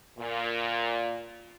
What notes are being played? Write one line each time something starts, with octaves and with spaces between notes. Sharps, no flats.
A#2